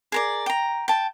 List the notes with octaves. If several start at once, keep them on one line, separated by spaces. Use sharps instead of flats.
G#4 A#4 D5
G5 A#5
G5 A5